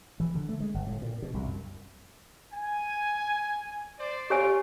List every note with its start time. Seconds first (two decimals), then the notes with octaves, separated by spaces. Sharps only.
0.20 E3
0.35 D3
0.49 A3
0.60 G#3
0.74 G1
0.86 A2
1.02 A#2
1.22 B2
1.34 C2
1.46 F#2
2.53 G#5
3.99 C5 D5
4.30 F4 G4 C#5 G#5